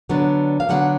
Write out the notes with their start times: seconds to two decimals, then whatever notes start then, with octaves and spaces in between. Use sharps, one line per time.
0.09 D3 F#3 B3 D4
0.60 F5
0.69 D3 F#3 B3 D4 F#5